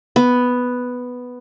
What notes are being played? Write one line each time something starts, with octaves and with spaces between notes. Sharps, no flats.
B3